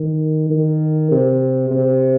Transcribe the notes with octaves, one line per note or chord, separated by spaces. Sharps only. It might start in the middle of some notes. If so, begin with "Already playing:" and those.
Already playing: D#3
D#3
C3
C3